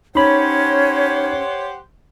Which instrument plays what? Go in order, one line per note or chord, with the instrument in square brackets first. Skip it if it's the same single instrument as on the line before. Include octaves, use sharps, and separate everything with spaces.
[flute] C#4 [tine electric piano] D#4 B5 [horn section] G4 C5 F#5 [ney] C#5